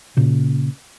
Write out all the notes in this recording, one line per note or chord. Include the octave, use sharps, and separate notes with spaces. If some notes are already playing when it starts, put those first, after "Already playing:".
A#2 C#3